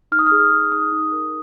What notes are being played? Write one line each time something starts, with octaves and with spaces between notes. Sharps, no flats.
D#4 F6
D#6
F6
G#4
G#4
D#4 D#6
D#4
A#4